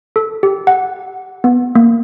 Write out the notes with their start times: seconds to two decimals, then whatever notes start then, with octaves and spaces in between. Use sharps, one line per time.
0.16 A4
0.43 G4
0.67 F#5
1.44 B3
1.75 A#3